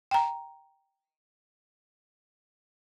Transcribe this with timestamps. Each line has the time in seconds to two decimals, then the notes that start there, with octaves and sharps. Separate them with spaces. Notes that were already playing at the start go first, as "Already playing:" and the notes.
0.11 G5 A#5